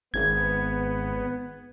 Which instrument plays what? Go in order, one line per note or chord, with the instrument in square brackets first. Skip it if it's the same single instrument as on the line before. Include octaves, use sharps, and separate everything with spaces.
[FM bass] G#1 [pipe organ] B3 [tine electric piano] G#6